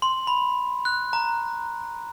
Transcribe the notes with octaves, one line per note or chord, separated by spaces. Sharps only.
C6
B5
F#6
A#5